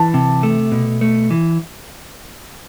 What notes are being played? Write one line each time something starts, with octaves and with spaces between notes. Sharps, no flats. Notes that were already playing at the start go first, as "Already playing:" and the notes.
Already playing: E3 A5
C3
A3
B2
A3
E3